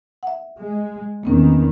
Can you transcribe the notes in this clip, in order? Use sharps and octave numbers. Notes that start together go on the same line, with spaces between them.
E5 F#5
G#3
E2 D#3 A#3 C4 C#4